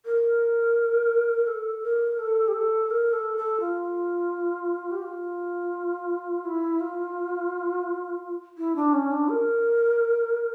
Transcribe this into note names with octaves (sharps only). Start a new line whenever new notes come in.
A#4
A4
A#4
A4
G4
A4
A#4
A4
A4
F4
G4
F4
E4
F4
E4
D4
C#4
D4
A#4